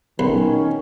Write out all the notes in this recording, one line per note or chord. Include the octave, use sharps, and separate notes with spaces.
B1 D#3 C#4